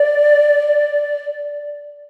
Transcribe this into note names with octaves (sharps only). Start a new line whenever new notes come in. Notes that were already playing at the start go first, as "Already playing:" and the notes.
Already playing: D5